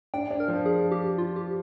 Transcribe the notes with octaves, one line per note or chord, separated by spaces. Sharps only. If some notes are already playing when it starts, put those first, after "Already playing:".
D4 G5
D4
A#4
F3
G#4
G4
F4
G4